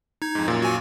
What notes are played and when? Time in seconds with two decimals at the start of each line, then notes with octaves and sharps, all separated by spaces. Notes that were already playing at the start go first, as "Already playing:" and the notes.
0.22 D#4 G#6
0.35 F2 G#2
0.48 F#2 A#2
0.62 F#4 G#5